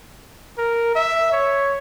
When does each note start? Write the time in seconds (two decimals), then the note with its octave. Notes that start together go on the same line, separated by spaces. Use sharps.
0.58 A#4
0.95 E5
1.32 C#5